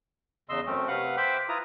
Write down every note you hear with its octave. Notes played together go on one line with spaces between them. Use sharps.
E2 C#3 D#5 C6 E6
F#2 A3 C4 C#4
C3 B4 F5 F#5 F#6
C5 E5 G5 B5 D6 F#6
E4 F4 B4 A#5 D#6